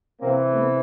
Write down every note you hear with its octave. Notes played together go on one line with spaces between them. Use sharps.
C3 E3 A#3 C4
A3 B3